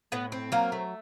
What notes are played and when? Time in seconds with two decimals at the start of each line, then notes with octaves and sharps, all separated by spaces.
0.12 A2 B3 B4
0.32 C4
0.52 F#3 A#3 A#4
0.72 A3